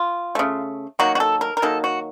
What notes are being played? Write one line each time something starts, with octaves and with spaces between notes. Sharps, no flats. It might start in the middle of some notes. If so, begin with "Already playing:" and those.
Already playing: F4
C#3 A3
D#3 F#3 A#3 F#4
F#4
A4
A#4
A#4
D#3 F#3 A#3 A4
F#4